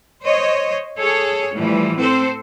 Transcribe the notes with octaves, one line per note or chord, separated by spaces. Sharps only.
C5 C#5 D#5
G#4 A4 C#5
A2 E3 F3 G3
C4 A4 C5